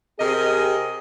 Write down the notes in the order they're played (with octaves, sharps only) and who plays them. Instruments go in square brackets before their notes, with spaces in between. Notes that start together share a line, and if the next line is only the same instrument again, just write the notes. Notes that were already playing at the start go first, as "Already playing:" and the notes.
[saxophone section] C3 A#4 D#5 [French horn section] C4 G4 G#4